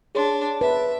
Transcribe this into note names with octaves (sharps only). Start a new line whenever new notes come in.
D4 G#4 C#5 C6
B4 E5